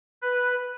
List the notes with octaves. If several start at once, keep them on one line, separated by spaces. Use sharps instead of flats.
B4